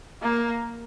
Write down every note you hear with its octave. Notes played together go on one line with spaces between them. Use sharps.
A#3